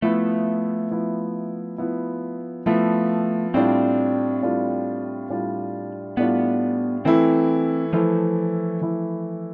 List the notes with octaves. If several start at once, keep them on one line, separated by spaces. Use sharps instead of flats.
F3 A3 B3 E4
F3 B3 E4
F3 B3 E4
F3 A3 B3 E4
A2 G3 C4 D4 F4
A2 G3 D4 F4
A2 G3 D4 F4
A2 G3 B3 D4 F4
E3 A3 C4 E4
E3 F3 A3 E4
E3 A3 E4